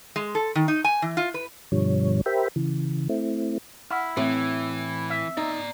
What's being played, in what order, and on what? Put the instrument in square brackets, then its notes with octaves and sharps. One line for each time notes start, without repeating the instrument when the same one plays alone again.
[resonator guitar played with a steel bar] G#3
A4
D#3
D#4
G#5
E3
F4
B4
[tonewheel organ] G2 B2 D3 F3 G3 C#5
G4 A#4 C5 E5 G5 B5
C#3 E3
A3 C4 E4
[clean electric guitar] E4 [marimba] F#5 E6 F6
[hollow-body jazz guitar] A2 [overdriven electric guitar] E3 [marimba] C4
[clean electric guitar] E5
[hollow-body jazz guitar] D#4 [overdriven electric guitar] D5 A#5